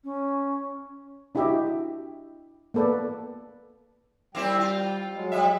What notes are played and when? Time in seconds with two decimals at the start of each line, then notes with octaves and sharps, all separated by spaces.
0.04 C#4
1.35 D4 E4 F#4 G4 D#5 E5
2.74 A#3 B3 A4 B4 D5
4.35 G3 A#3 C4 E4 G5
4.60 F4
5.14 F#3 G#3
5.32 G3 E5